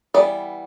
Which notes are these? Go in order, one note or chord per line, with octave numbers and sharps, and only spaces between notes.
E3 G3 B3 D5